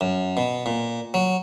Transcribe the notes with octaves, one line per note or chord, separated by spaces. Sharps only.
F#2
B2
A#2
F#3